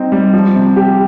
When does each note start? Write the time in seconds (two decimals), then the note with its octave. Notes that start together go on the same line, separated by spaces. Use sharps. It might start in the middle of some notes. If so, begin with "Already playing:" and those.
Already playing: G3 C4 D#4
0.12 G3
0.33 F3
0.55 C3
0.76 G4